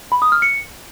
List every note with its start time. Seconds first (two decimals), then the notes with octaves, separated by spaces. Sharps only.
0.12 B5
0.22 D#6
0.32 F6
0.42 C#7